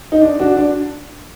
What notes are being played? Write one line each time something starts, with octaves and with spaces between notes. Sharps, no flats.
D#4
D4
D4 F#4
D4